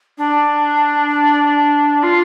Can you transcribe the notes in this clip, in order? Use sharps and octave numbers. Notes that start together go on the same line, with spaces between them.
D4
F4